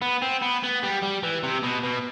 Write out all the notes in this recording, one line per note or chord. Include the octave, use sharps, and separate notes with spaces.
B3
C4
B3
B3
G3
G3
E3
C3
B2
B2